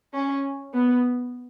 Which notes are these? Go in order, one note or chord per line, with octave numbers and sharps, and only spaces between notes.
C#4
B3